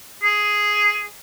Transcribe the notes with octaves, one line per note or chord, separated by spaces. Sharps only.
G#4